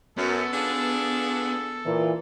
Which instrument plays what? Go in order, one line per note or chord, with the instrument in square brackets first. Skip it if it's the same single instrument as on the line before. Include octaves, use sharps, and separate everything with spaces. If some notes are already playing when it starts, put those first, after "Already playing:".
[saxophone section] F#2 [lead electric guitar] B3 [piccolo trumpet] A4
[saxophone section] D4 F4 G#4
[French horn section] A#2 E3